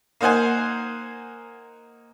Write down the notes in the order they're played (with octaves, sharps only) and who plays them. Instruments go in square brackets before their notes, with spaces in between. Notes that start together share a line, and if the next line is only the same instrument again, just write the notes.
[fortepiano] A#3 D#4 C5 F#5 G#5